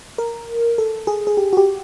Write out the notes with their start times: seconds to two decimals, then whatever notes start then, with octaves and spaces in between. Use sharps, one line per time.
0.18 A#4
0.78 A4
1.07 G#4
1.27 G#4
1.37 G4
1.53 F#4
1.57 G4